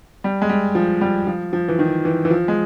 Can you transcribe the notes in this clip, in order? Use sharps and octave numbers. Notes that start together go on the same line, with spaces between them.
G3
G#3
G3
F3
G3
F3
F3
E3
D#3
E3
E3
F3
G#3